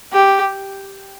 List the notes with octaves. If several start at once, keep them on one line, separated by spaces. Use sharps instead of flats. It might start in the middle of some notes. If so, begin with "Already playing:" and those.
G4